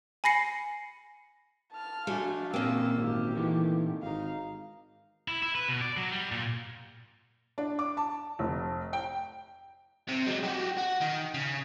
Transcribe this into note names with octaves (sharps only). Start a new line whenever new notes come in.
G#5 B5 A#6 C7 C#7
A5 F6
F3 A3 D4 F#4 F5 G#5
A#2 C#3 E3 A#3 C4 G5 E6
G#1 G4
C3 E3 A3 D#4
G#1 D#4 F5
E4
E4
B4
B2
D5
F#3
G3
A#2
D4
D6
A5
F1
G5
C3
F#3 G#3
F#4 G4
F#4
D#3
C#3